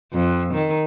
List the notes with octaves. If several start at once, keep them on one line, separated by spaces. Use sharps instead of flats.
F2
D#3